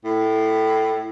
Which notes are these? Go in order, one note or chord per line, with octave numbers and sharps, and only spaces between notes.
A2